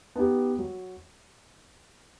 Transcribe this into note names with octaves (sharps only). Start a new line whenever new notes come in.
B3 D#4 G4
F#3